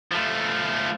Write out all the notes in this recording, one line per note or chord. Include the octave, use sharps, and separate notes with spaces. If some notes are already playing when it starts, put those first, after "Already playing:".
F3 A3